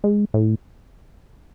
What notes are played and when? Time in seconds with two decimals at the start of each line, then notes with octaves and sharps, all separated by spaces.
0.04 G#3
0.34 A2